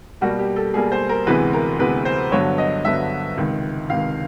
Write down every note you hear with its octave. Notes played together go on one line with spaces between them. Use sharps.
B2 G3 A#3 F#4
G4
A4
B2 G3 A#3 G#4
C5
A#4
D2 C3 E3 G#3 B3 B4
A#4
D2 C3 E3 G#3 B3 B4
C5
G2 D3 F#3 B3 C#5
D#5
G2 D3 F#3 B3 E5
C#2 C3 D#3
C#2 C3 D#3 F5